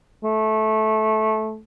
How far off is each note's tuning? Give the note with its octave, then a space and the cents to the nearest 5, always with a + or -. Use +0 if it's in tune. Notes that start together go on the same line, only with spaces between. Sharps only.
A3 -15